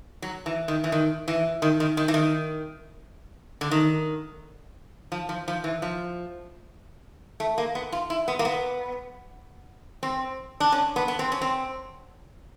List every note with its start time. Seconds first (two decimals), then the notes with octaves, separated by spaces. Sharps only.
0.22 F#3
0.46 E3
0.68 D#3
0.84 E3
0.92 D#3
1.28 E3
1.62 D#3
1.80 D#3
1.97 D#3
2.08 E3
2.14 D#3
3.61 D3
3.71 D#3
5.12 F3
5.29 F3
5.48 F3
5.64 E3
5.82 F3
7.40 A3
7.58 A#3
7.75 B3
7.92 F4
8.10 E4
8.28 B3
8.39 A#3
8.45 B3
10.03 C4
10.60 D4
10.72 C#4
10.96 B3
11.08 B3
11.19 C4
11.32 C#4
11.41 C4